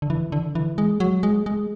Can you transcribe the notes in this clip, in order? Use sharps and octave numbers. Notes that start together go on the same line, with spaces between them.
D3
E3
D3
E3
G#3
F#3
G#3
G#3